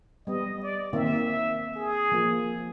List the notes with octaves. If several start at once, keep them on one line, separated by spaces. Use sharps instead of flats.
G3 B3 D#5
D5
D#3 A#3 C4 E5
G#4
F3 A#3